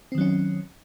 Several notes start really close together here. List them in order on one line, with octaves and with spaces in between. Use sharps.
C4 D#3 F#3 C#4